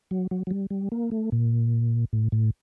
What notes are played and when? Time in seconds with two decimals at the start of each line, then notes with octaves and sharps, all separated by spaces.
0.11 F#3
0.31 F#3
0.47 F#3
0.51 G3
0.70 G3
0.92 A#3
1.11 A3
1.32 A#2
2.13 A2
2.32 A2